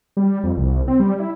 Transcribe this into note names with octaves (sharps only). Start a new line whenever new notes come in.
G3
F2
C2
C4
G3
E4